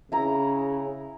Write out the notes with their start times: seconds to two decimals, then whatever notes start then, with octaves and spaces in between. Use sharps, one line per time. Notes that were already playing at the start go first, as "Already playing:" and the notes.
0.12 C#3 E4 A#5